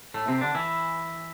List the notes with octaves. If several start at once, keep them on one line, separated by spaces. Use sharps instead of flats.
A2 A3
C3 C4
D3 D4
E3 E4